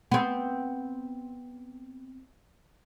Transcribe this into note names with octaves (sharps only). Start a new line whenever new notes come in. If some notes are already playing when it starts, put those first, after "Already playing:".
B3 C4